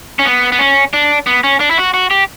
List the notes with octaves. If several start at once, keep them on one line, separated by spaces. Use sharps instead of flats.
C#4
B3
B3
C#4
D4
B3
C#4
D4
E4
F#4
F#4
G4